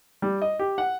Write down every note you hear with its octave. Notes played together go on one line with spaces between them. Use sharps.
G3
D#5
G4
F#5